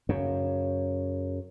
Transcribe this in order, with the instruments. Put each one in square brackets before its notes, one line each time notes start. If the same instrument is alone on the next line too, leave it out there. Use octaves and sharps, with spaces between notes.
[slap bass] F#2 C#3